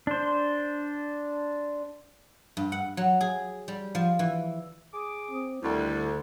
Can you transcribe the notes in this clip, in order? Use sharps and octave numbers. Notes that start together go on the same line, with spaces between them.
D4 C5
G2
F#5
F#3
G#4
G3
F3
E3
G#4 D6 D#6
C4
D2 D3 D#3 G3 E4